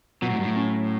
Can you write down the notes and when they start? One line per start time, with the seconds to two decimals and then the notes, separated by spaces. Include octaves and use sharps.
0.22 B2 F#3
0.30 A2
0.36 G2
0.44 A2
0.56 C#4